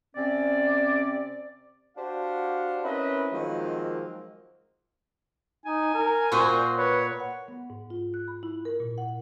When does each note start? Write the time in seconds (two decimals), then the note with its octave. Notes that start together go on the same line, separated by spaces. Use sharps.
0.15 C3 C4 C#4 D5
1.97 D4 F#4 G4 C5 F5 F#5
2.84 C4 C#4 E4 A#4 B4 D#5
3.32 D#3 F3 F#3 G#3 A#3 C4
5.66 D#4 G#5
5.94 A#4
6.32 A#2 F#4 C5 G5
6.78 B4 C#5
7.20 F#5
7.48 B3
7.70 G#2
7.90 F4
8.14 F#6
8.28 B5
8.43 E4
8.65 A#4
8.80 A#2
8.98 F#5